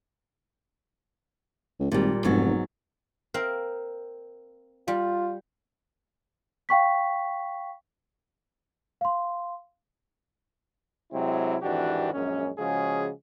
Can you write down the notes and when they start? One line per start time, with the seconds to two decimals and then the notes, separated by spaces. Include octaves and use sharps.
1.80 C#2
1.92 G#1 A#2 G3
2.24 F1 G#2 F#3 B3
3.34 C4 A#4 F5
4.88 G3 F4
6.69 F5 G5 C#6 B6
9.01 F5 C6
11.12 C3 F#3 G#3 C4 E4
11.62 G#1 F2 E3 D4 F#4 G4
12.13 A#1 F#2 G#3 C#4
12.58 C#3 F3 G#3 C#4 F#4 G#4